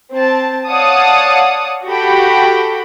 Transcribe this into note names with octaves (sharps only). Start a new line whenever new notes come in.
C4 A5
C#5 D5 F5 F#5 A5 D#6
F#4 G4 A4 G5 B5